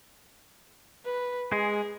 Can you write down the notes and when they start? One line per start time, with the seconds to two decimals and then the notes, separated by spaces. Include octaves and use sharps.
1.06 B4
1.52 G#3 G#4